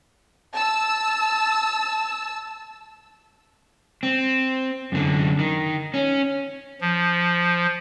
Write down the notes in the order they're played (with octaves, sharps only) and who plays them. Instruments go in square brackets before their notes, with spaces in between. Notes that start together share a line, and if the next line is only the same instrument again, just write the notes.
[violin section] A5 E6
[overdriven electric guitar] C4
F#2 D3
D#3
C#4
[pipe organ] F3